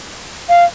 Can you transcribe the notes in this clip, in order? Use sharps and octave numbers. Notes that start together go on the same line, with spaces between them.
F5